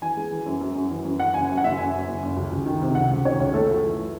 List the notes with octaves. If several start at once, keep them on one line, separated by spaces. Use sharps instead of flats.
E3 G#5
G#3
E3
F#2
F#2
F#2
E3
F#2
E3 F#5
F#1 G#5
F#2
F#5
F#1 E5
F#1 G#5
F#2
F#1
F#1
C#2
C#2
D#3
C3
C#2 F#5
C#2
D#3 C#5
C#2
A3 A4
F#2
E3